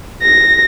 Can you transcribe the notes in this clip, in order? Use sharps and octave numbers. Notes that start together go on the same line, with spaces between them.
A#6